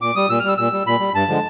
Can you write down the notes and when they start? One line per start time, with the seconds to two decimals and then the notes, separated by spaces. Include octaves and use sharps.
0.01 A#2 D6
0.16 G3 D#6
0.29 A#2 E6
0.40 F6
0.44 G3 E6
0.58 A#2 E6
0.73 G3
0.86 A#2 B5
1.00 G3
1.14 G2 A5
1.28 D3 F3 G#3